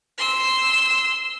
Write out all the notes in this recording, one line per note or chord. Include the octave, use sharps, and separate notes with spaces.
C6 E6